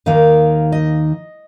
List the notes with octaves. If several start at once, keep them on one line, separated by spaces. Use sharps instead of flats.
D#2 D#3 A#3 D#4 F5
D#5